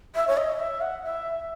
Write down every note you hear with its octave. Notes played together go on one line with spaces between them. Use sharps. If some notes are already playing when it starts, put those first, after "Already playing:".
E5
C#5
D#5
E5
F#5
E5